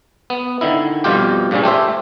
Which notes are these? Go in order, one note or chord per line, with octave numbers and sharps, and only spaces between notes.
B3
D3 D#3 E4
F2 B2 G3 F4 G4
G2 A#2 C#3 G3 C#4
A3 G4 C5 E5